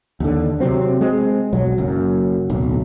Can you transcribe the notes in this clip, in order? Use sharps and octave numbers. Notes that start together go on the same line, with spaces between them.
D#2 D3
C3 E3 F#3 C4
G#3 C4
E1 B1 F#3
F#1 F#2
D1 B1